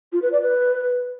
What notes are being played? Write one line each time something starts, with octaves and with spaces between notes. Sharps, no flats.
F4
B4
D5
B4